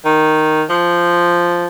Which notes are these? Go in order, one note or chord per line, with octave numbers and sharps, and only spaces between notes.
D#3
F3